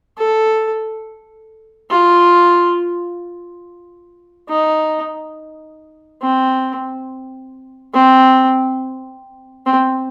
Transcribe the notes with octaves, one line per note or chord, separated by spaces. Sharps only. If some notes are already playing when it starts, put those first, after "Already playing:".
A4
F4
D#4
C4
C4
C4